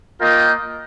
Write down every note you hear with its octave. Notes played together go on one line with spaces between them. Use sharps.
A#3 F4 A#4 D#5 G5